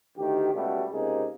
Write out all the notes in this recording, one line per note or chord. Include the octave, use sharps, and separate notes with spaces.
D2 D#3 G4
C#2 B2 G3 A3 B3
C#2 C3 A#3 D#4 G#4